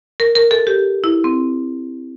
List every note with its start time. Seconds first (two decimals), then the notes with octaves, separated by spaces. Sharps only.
0.20 A#4
0.35 A#4
0.51 A4
0.67 G4
1.04 E4
1.24 C4